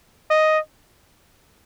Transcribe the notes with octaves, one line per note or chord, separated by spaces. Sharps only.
D#5